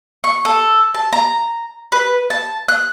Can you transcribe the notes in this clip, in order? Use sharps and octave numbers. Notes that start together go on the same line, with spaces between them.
C#6
A4
A5
A#5
B4
A5
F#6